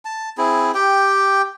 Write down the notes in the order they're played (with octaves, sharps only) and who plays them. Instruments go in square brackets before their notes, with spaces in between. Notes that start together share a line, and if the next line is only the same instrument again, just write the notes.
[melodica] A5
C4 E4 G#4
G4 G5